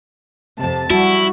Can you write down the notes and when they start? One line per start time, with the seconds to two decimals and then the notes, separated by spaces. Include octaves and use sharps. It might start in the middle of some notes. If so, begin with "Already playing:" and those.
0.60 F2 C3 A5
0.90 G3 E4 F#4